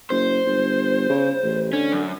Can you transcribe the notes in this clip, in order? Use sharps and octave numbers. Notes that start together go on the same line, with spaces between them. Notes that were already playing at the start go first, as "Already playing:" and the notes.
F#1 C5
G1
C#3
A1
D3 C#4
F#2